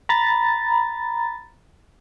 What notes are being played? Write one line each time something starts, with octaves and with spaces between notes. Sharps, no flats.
A#5 B5 A6